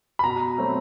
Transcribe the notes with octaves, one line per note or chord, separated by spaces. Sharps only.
B5
B2 A#5
F#3 A3 C4